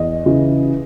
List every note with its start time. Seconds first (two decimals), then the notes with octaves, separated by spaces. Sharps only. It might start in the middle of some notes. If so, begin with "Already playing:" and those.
Already playing: E2 D#5
0.26 C#3 E3